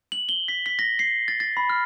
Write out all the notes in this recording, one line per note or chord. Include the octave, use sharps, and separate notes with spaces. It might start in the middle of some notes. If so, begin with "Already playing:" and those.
F#7
G7
B6
B6
A#6
C7
A6
A6
B5
F6